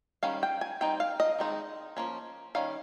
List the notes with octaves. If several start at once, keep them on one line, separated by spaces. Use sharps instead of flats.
D#3 G3 C#4 F5
G5
G#5
G3 C4 D#4 G5
F5
D#5
D#3 G#3 C4 D#4
F3 A#3 C#4
D#3 G3 C#4 F5